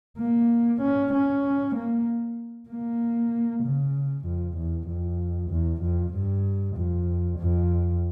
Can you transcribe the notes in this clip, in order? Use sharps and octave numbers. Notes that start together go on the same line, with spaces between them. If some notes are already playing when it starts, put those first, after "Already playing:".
A#3
C#4
C#4
A#3
A#3
C#3
F2
E2
F2
E2
F2
G2
F2
F2